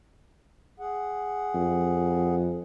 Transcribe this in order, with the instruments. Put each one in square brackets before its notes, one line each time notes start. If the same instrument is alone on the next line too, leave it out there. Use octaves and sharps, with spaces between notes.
[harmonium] G#4 F#5
[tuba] F2